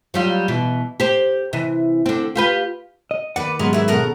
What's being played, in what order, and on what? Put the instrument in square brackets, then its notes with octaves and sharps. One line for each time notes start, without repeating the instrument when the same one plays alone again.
[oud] F#3 G3 F4
B2 E3
G4 C5
C3 E3
D3 C4
F4 G4 B4
[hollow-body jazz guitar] D#5
[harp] D#2 [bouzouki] B4 D5 [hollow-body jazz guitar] F#5
[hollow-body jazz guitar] G#2 F#3 [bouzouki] G#3 B3 A#4 [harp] C#4 G#4
[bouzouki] E3 E4
[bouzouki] B2 A#4 F#5 [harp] A4